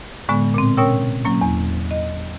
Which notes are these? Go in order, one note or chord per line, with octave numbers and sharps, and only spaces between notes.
A2 D3 G#3 B3
A#2 C4
B2 C#4 A#4 C#5 G5 E6
F#3 A#3 C#4
E2
D#5